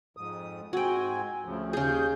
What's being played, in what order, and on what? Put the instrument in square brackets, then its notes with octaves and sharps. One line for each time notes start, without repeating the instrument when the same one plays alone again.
[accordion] F2 G#2 D#6
[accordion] G#2 C4 G#5 [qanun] F#4 G5
[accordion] D2 C#3 F3
[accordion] D#2 G6 [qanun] C#3 G#4